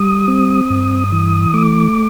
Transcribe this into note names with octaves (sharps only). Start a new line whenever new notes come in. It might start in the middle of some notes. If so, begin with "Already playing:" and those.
Already playing: G3 D#6
C4
G2
E3
A3 D6